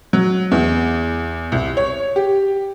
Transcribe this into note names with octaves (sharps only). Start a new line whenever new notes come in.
F#3
E2
C2
C#5
G4